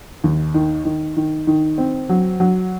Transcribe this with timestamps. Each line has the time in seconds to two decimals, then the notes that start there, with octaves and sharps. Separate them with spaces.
0.24 D#2
0.54 D#3
0.85 D#3
1.17 D#3
1.47 D#3
1.78 C4
2.09 F#3
2.40 F#3